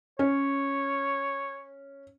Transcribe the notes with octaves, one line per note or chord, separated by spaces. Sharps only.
C#4 C#5